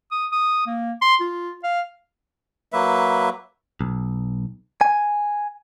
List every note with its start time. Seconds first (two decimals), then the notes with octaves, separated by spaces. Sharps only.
0.11 D#6
0.32 D#6
0.67 A#3
1.02 C6
1.21 F4
1.64 F5
2.72 F#3 A#3 B4 E5
3.81 B1
4.81 G#5